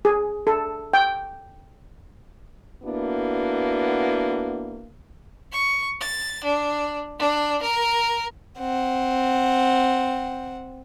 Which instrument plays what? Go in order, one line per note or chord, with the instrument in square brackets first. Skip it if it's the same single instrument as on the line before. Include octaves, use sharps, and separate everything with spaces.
[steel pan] G#4
A4
G5
[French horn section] A#3 B3 D4 E4 F#4
[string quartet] C#6
A6
D4
D4
A#4
[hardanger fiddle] C4 F#5